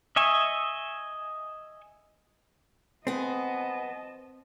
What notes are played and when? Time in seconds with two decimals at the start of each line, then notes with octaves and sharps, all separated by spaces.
0.16 D#5 E5 G#5 C#6
3.07 B3 C4 G#4 D#5 A5